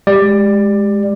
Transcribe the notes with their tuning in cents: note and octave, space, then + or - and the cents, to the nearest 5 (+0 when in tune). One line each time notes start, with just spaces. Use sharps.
G#3 +0 G4 +0 D5 +15